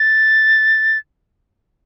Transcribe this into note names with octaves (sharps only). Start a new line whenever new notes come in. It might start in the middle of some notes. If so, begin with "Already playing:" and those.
Already playing: A6